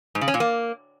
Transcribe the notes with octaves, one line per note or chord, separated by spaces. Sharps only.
G#2
C#3
C#4
A#2
A#3